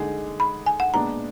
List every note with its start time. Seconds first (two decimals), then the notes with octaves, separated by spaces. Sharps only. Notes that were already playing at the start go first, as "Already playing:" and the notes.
Already playing: D3 G#3 D#4 G#4
0.40 B5
0.66 G#5
0.80 F#5
0.94 A#2 G#3 B3 D4 A#5